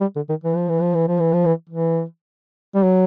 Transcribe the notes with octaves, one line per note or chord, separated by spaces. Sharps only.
G3
D3
D#3
E3
F3
E3
F3
E3
F3
E3
F3
E3
E3
G3
F#3